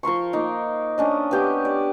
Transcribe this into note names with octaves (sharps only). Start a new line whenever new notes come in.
F3 A#4 C6 C#6
A#3 D#4
C#4 D4 D#5
B3 G4 G5
D5